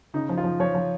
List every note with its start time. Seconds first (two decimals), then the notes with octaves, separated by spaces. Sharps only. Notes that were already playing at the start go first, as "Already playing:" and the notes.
0.14 C#3 D#4
0.29 F3
0.38 F4
0.44 F3
0.60 F3 C#5
0.75 F3